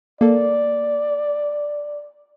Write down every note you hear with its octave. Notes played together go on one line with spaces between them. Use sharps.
A#3 A4 D5